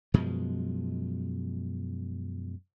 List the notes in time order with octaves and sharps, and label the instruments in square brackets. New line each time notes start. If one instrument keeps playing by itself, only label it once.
[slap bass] F#2 B2 F3 G#3